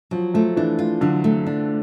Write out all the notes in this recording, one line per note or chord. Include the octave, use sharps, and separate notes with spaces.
F3 F#3
F3 A3
E3 D4
F4
D3 F#3
A3
D4